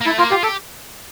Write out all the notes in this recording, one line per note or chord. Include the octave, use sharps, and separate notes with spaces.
A#3
A3 E4
A#3 F4
F4 G4
G4 A4